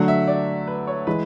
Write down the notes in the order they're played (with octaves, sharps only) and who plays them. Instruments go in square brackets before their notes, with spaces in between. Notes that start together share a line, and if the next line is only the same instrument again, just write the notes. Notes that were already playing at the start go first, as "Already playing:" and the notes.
Already playing: [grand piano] D3 F#3 A3 [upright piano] F#5
[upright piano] E5
D5
B4
C#5
[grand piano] E3 G#3 [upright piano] B4